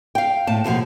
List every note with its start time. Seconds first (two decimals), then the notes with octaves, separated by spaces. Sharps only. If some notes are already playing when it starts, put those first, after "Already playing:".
0.15 F5 G5
0.47 A2 A5
0.64 D#2 B2 D3 F3